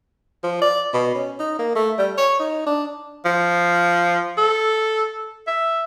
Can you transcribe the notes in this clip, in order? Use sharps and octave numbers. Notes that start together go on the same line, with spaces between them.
F3
D5
B2
C#4
D#4
A#3
A3
G3
C#5
D#4
D4
F3
A4
E5